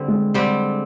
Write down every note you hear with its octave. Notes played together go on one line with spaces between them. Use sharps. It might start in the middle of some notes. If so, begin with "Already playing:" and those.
Already playing: D3 G3 C4
G#3
D3 G3 C4